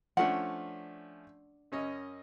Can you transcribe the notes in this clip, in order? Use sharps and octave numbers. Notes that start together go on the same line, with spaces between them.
F3 A3 C#4 D4 F#4 F#5
F#2 C#4 D#5